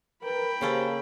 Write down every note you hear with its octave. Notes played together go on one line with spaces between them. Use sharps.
A#4 B4 G5 B5
C#3 A#3 C#4 G4 A4 C5